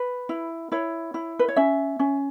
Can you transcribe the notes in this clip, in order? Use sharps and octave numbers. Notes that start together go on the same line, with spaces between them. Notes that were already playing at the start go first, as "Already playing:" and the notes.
Already playing: B4
E4
E4 C#5
E4
B4
C#5
C#4 E5
C#4